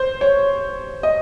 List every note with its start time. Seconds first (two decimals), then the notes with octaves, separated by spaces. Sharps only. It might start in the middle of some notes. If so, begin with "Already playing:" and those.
Already playing: C5
0.21 C#5
1.03 D#5